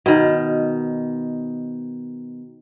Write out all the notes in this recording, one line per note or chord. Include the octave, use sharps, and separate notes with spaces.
B2 D#3